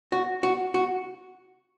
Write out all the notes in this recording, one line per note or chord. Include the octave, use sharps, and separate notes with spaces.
F#4
F#4
F#4